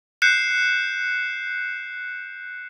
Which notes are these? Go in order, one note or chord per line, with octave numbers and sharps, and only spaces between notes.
F#6 G6 C7 C#7 E7